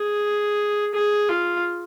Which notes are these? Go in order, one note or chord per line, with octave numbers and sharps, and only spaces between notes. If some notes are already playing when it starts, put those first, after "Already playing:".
Already playing: G#4
G#4
F4